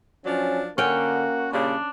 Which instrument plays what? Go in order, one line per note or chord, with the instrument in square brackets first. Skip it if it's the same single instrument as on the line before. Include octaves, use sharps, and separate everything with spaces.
[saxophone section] F3 F#3 D4 [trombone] C#4
[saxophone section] D3 [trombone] A#3 [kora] C#4 G5 [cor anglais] F#4
[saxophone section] A#2 C#3 G3 [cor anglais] D4